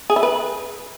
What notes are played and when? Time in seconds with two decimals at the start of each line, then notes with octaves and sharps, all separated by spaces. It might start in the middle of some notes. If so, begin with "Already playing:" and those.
0.10 G#4
0.16 E4
0.23 B4